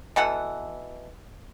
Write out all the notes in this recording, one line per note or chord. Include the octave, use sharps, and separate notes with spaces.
B2 E3 A4 F#5